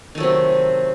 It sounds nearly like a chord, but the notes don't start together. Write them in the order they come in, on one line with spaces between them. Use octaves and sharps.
D#3 A3 F#3 C3